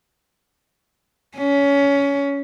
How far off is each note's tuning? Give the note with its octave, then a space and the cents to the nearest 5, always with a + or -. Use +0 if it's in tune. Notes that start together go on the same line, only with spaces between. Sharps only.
C#4 +20